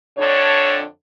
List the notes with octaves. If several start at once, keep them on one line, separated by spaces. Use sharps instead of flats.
F2 D3 D4 C#5